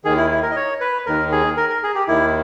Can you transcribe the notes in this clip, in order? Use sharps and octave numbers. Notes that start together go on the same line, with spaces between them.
D#2 D#3 G#4
E4
E4
A#4
D#5
C#5
B4
D#2 D#3 A#4
G#4
A#4
A#4
G#4
G4
D#2 D#3 E4